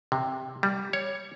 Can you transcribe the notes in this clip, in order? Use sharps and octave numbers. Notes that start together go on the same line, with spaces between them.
C3
G3
C#5